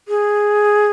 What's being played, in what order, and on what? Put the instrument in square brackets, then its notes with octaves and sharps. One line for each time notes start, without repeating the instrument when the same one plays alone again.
[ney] G#4